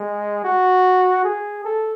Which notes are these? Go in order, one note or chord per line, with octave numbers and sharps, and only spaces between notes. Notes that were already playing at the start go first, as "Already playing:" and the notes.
Already playing: G#3
F#4
G#4
A4